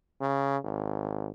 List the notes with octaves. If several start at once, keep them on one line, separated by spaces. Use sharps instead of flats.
C#3
G#1